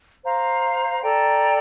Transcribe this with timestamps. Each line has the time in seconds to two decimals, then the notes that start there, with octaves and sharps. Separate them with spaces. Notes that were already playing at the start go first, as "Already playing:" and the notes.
0.24 C5 F5 A#5
1.03 A4 D5 G5 A#5